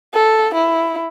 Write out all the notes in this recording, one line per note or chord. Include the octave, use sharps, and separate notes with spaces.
A4
E4